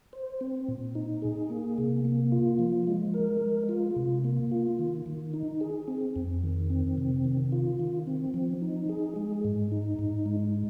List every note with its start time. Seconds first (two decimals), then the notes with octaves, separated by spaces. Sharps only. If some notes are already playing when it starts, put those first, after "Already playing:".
0.13 C5
0.41 C4
0.68 A#2
0.95 D#4
1.22 G#4
1.50 A#3
1.78 C3
2.05 A#3
2.32 F4
2.59 F3
2.87 G#3
3.14 A#4
3.41 G#3
3.69 F4
3.96 C3
4.24 A#3
4.52 F4
4.79 D#3
5.06 D#3
5.34 D#4
5.61 G#4
5.88 C4
6.16 F2
6.43 D#3
6.70 C4
6.98 C3
7.25 D#3
7.52 F4
7.80 D#3
8.07 C4
8.34 F3
8.62 D#4
8.89 G#4
9.16 G#3
9.45 G#2
9.72 D#4
9.99 G#2
10.26 G#3